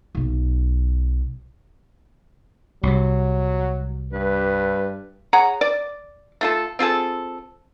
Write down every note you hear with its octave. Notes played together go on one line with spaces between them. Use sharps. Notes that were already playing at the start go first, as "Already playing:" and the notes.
B1 B2
C2 C3 F#3
G2 B4
G#4 C#5 F#5 A#5
D5
A3 F4 A4
C4 F4 G#4 A4